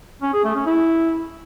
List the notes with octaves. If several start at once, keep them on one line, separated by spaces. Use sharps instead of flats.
C#4
G#4
A3
C#4
E4